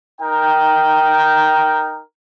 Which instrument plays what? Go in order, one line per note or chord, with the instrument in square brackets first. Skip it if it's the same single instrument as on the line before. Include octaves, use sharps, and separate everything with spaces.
[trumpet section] D#4 A#4 G5